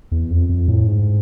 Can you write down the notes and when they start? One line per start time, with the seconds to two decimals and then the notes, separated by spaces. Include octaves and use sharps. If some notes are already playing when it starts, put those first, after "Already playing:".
0.12 E2
0.30 F2
0.49 F2
0.68 A2
0.87 G#2